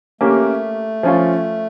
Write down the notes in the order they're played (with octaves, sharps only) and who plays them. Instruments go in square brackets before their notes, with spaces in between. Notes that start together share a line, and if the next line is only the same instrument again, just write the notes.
[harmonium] A3 [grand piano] A#3 C#4 G4
[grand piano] F3 C#4 F4